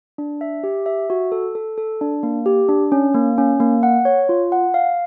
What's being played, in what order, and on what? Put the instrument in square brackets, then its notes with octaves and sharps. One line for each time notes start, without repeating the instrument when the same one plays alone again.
[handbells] D4
E5
G4
E5
F#4
A4
A4
A4
D4
A#3
G4
D4
C#4
A#3
C#4
A#3
F#5
C#5
F4
F#5
F5